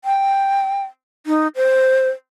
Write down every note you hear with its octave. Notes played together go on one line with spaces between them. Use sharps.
G5
D#4
C5